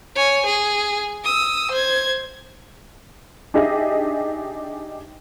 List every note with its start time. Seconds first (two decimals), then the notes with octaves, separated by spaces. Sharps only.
0.16 C#5 G#5
0.46 G#4
1.24 D#6 E6
1.71 C5 G#6
3.54 D4 D#4 G4 G#4 D#5 E5